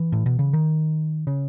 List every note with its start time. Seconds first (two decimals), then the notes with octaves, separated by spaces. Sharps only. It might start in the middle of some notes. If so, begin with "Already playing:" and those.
Already playing: E3
0.12 A2
0.26 B2
0.39 C#3
0.53 D#3
1.27 C#3